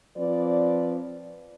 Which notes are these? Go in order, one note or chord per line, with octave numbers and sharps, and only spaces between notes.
F3 C4 B4 D5